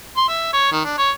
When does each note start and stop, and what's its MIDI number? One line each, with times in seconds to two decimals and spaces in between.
0.17 0.25 84
0.29 0.51 76
0.53 0.69 73
0.72 0.81 51
0.85 0.93 62
0.98 1.11 73